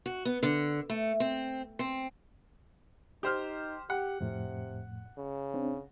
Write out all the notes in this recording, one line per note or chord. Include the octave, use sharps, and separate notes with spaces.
F#4
B3
D3
A3
C4
C4
D#4 G4 C5 F6
G4 F#5
F2 A2 C3
C#3
C4 D4